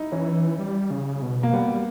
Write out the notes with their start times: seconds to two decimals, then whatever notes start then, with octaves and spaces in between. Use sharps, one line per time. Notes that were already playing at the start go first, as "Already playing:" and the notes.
Already playing: D#4 E4
0.12 E3 C#4
0.59 G3
0.91 C#3
1.22 B2
1.43 A#3
1.53 G3 B3